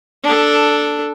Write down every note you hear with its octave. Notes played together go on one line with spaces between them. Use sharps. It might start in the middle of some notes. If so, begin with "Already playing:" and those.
D4 A4